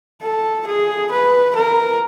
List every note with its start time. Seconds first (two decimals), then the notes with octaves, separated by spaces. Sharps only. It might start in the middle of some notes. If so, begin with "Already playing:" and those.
0.22 A4
0.67 G#4
1.11 B4
1.55 A#4